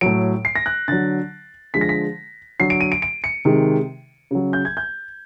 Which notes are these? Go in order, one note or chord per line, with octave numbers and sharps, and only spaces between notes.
A2 F#3 D7
C7
A#6
F#6
D3 F#3 A6
D3 F3 G#3 B6
A#6
B6
D3 F#3 C7
D7
D#7
D7
D7
C#7
C3 D#3 G#3
C#3 F#3
G6
G#6
G6